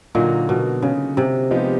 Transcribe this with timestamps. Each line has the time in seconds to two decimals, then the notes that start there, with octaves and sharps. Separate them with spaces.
0.15 A#2 D3 F#3 A#3 D#4 F#4
0.49 B2
0.83 C#3
1.17 C3
1.51 F3 G#3 B3 D#4 G4